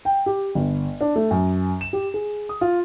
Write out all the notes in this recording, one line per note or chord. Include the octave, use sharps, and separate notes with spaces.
G5
G4
G1
D4
A3
F#2
E7
G4
G#4
D#6
F4